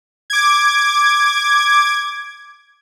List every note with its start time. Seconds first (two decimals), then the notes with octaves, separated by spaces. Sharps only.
0.30 D6 G#6